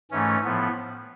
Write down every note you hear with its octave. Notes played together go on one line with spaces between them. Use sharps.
G#2 E3 A3 C#4
A2 F3 B3